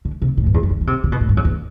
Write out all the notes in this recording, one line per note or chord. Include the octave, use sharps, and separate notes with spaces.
D3
C3
A2
G2
E2
F#2
D3
D3
C3
D3
B2
A2
G2
F#2
E2